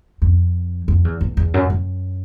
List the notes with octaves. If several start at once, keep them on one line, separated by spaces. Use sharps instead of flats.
F2
F2
E2
E2
E2
F#2
F#2